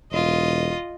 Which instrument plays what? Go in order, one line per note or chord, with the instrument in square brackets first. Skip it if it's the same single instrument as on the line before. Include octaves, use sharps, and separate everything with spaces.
[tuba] E1 [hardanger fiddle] F4 D#5